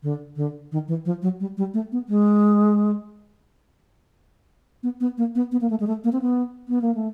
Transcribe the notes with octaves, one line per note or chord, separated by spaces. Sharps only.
D3
D3
D#3
E3
F3
F#3
G3
G3
A3
B3
G#3
B3
B3
A#3
B3
B3
A#3
A3
G#3
A3
A#3
C4
B3
B3
A#3
A3